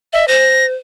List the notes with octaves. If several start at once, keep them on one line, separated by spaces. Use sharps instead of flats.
D#5 E5
C5 A#6